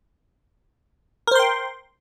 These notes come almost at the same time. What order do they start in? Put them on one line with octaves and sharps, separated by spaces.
A#4 C5 C6 G5